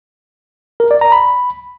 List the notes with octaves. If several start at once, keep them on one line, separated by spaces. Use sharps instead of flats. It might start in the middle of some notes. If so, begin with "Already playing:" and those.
A#4
D5
A#5
B5